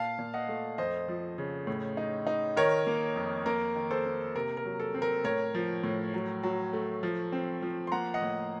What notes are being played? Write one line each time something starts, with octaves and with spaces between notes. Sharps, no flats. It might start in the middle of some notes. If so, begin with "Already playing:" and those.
Already playing: A#2 F5 A5
A#2
D#5 F#5
A3
F2 C5 D#5
F3
C#3
A2
D#4
D#4
D#3 A#4 C#5
A#3
F2
A#3 A#4
D#3
A4 C5
A#3
C3 A#4
A#4
F#3
A4
C4
A#4
A2 A#4 C#5
F3
A2
F#3
F#3
A3
F3
C4
F3
C6
A#3 F#5 A#5
D#5 F#5
A2